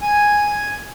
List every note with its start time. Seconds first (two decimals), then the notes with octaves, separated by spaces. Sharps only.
0.01 G#5